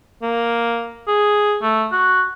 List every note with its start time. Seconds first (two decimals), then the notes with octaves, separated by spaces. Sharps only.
0.23 A#3
1.08 G#4
1.62 A3
1.92 F#4